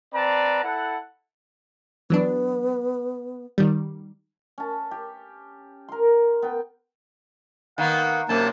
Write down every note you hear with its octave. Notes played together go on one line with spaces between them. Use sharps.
C4 B4 D5 A5 A#5
E4 A4 F#5
E3 F#3 B3 D4
D#3 G3
C#4 A5
G4
A#4 C6
B3 G5
D#3 A#3 B3 F#5
F#2 C3 A#3 A5